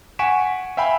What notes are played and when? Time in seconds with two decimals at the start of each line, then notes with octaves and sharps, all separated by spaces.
0.19 F#5 G#5 C#6 B6 D7 E7
0.77 E5 F5 G5 G#5 B5